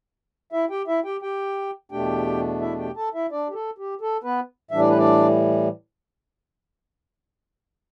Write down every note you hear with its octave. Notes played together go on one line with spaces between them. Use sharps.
E4 E5
G4 G5
E4 E5
G4 G5
G4 G5
E2 B2 A3 D4 G4 G5
E4 E5
G4 G5
A4 A5
E4 E5
D4 D5
G4
A4
G4
A4
B3 B4
A2 E3 G3 D4 E5
D5
B4
D4 D5